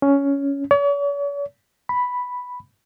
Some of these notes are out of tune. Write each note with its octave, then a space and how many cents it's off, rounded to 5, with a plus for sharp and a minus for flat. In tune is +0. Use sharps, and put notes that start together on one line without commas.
C#4 +10
C#5 +45
B5 +0